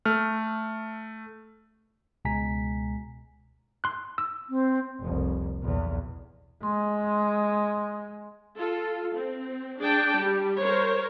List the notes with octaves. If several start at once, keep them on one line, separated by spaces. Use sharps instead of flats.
A3 F6
C#2 B2 G#3 G#5 A#5 B6
C6 F#6
E6
C4
F1 C2
B1 E2
G#3 C6
F4 A4
C4
D4 G#4 D5 G5 A5
G3 G4
A#4 C5 C#5